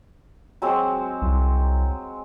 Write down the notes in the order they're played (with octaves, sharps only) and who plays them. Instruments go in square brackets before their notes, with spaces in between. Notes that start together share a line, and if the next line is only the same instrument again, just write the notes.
[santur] F#3 G#3 C4
[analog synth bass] C2